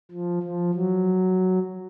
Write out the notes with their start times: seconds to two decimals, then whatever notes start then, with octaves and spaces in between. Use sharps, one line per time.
0.11 F3
0.42 F3
0.74 F#3